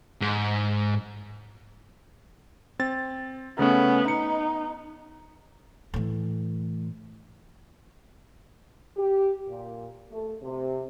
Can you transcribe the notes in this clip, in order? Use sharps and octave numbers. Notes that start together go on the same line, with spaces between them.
G#2
C4 A6
C#3 A3 B3 C#4
D#4 C#7
A2 E3
G4
A#2
A3
C3